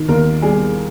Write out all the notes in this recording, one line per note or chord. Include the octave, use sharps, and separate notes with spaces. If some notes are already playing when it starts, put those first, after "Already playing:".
Already playing: D#3
D#2 A#4
G3 G#4